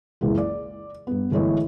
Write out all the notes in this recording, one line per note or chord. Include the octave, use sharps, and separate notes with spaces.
F#1 C#2 E3 G#3
D5
G2 B3
G1 E3 G#3 A3 C#5 D#5